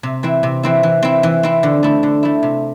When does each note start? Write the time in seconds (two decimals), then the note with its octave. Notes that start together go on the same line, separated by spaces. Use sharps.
0.03 C3
0.23 E3 C4 E4
0.43 C3
0.63 E3 C4 E4
0.83 E3
1.02 C4 E4
1.23 E3
1.43 C4 E4
1.63 D3
1.83 A3 E4
2.03 D3
2.23 A3 E4
2.43 C3